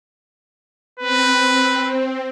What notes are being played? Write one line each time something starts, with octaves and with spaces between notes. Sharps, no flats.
C4 B4